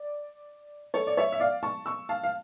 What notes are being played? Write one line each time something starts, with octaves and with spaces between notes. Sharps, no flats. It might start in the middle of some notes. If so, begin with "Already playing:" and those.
Already playing: D5
A4 C#5
D5
C#5 E5
E5
D5 F5
A5 C#6
C#6 E6
F5 A5
F5